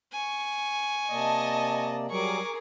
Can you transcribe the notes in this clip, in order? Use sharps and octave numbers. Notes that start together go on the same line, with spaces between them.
G#5 C#6
C3 A#3 D5 D#5 A5
F#3 G3 G#4 A#4 C#6 D6